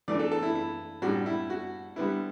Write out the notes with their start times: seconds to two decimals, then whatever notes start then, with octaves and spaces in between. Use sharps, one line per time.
0.08 E3 A3 D4 D5
0.20 A4
0.32 A4
0.43 E4
0.55 E4
1.02 A2 G3 D4 F#4
1.26 E4
1.50 F#4
1.96 D3 G3 B3 E4